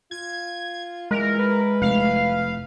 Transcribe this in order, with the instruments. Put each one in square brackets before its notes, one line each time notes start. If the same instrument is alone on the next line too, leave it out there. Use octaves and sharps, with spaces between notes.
[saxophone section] F4 [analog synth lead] G#6
[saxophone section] A#2 E3 [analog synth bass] G#3 [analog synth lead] A#4
[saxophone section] E3 E4 B4
[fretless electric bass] F1 [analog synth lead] F5